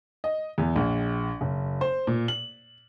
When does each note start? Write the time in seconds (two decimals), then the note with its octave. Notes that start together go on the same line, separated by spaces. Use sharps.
0.24 D#5
0.58 E2
0.76 A#1
1.41 F#1
1.81 C5
2.07 A#2
2.28 F#7